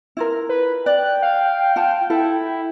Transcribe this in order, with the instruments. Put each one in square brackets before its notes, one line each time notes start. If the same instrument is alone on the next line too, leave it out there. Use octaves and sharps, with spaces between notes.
[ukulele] E4 F4 A#4
[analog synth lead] B4
[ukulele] D5 [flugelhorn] G5 [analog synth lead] F#6
[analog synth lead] F5
[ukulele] F4 F#5 A5
[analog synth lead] E4 [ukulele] A4